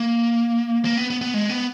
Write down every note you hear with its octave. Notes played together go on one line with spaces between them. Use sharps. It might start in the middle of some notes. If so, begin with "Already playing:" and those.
Already playing: A#3
A#3
B3
B3
B3
G#3
B3